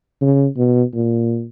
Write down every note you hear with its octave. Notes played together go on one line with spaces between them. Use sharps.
C#3
B2
A#2